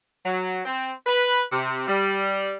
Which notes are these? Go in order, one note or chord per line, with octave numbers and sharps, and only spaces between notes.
F#3
C4
B4
C3
G3